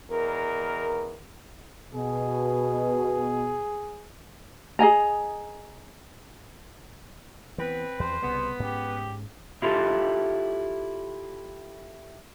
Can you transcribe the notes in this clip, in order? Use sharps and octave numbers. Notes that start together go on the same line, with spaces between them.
E2 B2 A#4
B2 G#4
G#4 D#5 G#5 A#5
E3 B3 C4 B4
E2 F3 C5
C2 C#3 G3 B3
G#2 C#4 G4
E4 F4 G4 A4